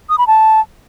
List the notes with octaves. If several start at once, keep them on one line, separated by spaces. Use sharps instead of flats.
D#6
B5
A5